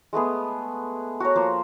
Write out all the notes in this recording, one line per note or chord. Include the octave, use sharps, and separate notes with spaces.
G#3 A3 B3 G#4
F#4 A#4 C#5
F3 A#3 C5